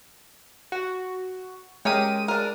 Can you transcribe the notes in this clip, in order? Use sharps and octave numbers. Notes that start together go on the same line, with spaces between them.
F#4
G#3 C#4 G4 A#4 D#7
D4 A#4